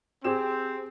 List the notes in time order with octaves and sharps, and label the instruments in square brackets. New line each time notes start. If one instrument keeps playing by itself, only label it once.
[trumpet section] C4 [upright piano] G4 G#4 E7